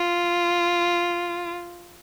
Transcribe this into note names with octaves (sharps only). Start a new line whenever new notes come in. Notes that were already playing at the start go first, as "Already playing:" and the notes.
Already playing: F4